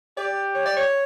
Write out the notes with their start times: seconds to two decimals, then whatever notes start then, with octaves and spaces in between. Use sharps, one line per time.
0.17 G4 D5
0.55 C#5
0.65 D5
0.77 C#5